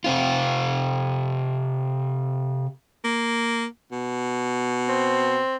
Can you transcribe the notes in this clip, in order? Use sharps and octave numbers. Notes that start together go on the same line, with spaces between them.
C3 C4 F4
A#3
B2
C4